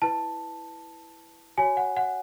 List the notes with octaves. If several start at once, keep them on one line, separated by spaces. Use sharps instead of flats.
E4 B4 A5
F#4 C#5 G#5
F#5
F#5